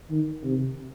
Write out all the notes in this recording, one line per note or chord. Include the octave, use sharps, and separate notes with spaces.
D#3
C3